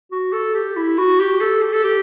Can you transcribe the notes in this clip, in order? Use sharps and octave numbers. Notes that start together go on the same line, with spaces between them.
F#4
A4
G4
E4
F#4
G4
A4
G4
A4
G4